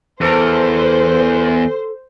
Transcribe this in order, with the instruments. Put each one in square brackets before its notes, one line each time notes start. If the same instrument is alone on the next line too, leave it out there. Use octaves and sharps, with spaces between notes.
[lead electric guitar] E2 [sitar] A4 A#4 [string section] C5